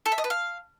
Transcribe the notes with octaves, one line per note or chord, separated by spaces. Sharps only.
A4
E5
D#5
B4
F5